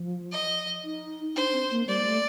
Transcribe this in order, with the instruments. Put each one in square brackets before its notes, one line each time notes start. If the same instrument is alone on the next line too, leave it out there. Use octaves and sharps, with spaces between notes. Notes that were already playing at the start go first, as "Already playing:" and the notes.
Already playing: [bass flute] F3
[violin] D#5
[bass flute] D#4
[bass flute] D4 [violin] C5
[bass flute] C4
A#3
[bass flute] G3 [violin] D5
[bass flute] A3